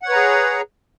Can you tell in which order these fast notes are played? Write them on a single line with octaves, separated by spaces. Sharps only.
F#5 C#5 B4 A#5 G#4